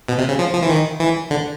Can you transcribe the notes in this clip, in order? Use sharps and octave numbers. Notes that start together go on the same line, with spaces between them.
B2
C3
C#3
F3
F3
E3
D#3
E3
D3